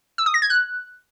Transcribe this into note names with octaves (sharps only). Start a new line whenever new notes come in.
E6
D#6
A#6
G#6
F#6